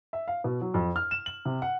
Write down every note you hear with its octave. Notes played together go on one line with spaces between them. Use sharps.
E5
F5
B2
F#3
F2
F6
E7
F#7
C3
F#5